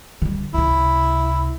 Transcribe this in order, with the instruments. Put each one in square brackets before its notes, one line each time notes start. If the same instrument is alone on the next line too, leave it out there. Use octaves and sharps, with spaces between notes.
[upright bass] D3 G3
[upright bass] C#2 C3 [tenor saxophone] E4